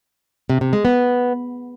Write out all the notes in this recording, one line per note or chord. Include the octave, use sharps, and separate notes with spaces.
C3
C3
G#3
B3